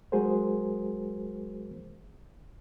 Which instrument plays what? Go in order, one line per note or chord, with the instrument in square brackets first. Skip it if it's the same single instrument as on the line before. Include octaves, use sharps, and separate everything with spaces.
[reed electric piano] F#3 G#3 F#4 G#4 A#4 C5